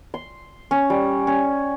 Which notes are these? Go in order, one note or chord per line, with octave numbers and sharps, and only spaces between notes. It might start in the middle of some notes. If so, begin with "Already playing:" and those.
C6
C#4
G3
C#4